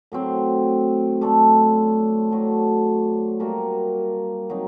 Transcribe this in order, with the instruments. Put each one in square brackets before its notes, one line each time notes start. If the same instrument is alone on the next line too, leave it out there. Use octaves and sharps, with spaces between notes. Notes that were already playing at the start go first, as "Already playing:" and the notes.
[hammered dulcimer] A2 F#3 C4
A3 D4 A4 C5
A2 F#3 A3
G3 A#3 F#4 A#4
F#3 C4 D#4